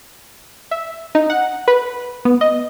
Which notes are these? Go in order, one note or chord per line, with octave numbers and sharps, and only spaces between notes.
E5
D#4
F#5
B4
B3
D#5